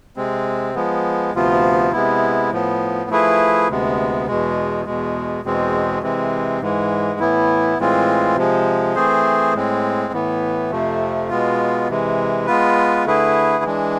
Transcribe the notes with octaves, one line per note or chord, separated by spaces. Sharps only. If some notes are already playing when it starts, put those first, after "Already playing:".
C3 G#3 C4
F3 G#3 B3
D2 C3 F3 B3 F4
C3 G#3 B3 E4
A2 F3 B3
F3 A3 E4 G#4 B4
D2 C3 G#3 B3
E2 B2 G#3
E2 B2 G#3
E2 B2 G#3 C4
C3 E3 G#3 C4
G#2 E3 G#3
A2 E3 B3 E4
A2 E3 G#3 C4 F4
C3 F3 G#3
E3 A3 C4 G#4 C5
A2 G#3 C4
A2 E3 B3
F2 C3 F3 A3
B2 G#3 B3 F4
C3 E3 G#3
G#3 B3 F4 B4
D3 A3 E4 G#4 B4
E3 G#3 D4